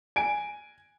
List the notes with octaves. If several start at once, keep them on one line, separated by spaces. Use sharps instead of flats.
G#5 D7